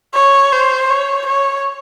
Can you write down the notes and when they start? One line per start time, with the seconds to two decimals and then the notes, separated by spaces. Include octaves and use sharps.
0.14 C#5
0.52 C5
0.90 C#5
1.27 C#5